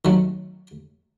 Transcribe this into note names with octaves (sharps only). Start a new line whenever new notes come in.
D#3 F#3 A3